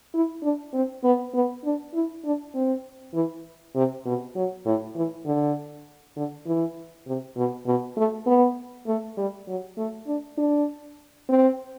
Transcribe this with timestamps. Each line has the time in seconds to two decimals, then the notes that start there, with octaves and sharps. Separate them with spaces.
0.14 E4
0.43 D4
0.74 C4
1.04 B3
1.34 B3
1.65 D4
1.94 E4
2.25 D4
2.55 C4
3.14 E3
3.75 C3
4.05 B2
4.36 F#3
4.66 A2
4.96 E3
5.26 D3
6.16 D3
6.46 E3
7.07 C3
7.37 B2
7.66 B2
7.97 A3
8.27 B3
8.87 A3
9.17 G3
9.48 F#3
9.78 A3
10.07 D4
10.37 D4
11.29 C4